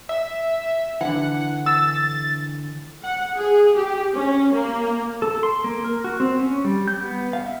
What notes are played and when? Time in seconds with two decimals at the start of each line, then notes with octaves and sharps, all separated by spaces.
0.09 E5
1.01 D3 E3 F#5
1.66 E6 A6
3.03 F#5
3.36 G#4
3.76 G4
4.15 C#4
4.52 A#3
5.22 A4
5.43 C6
5.64 A#3
5.85 A#4
6.04 F#4
6.20 C4
6.39 C#4
6.64 G3
6.88 G6
7.01 B3
7.33 F5
7.46 E5